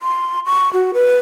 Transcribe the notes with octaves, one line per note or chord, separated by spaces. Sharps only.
C6
C#6
F#4
B4